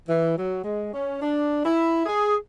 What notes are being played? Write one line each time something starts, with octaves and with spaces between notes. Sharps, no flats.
E3
F#3
G#3
C#4
D4
E4
G#4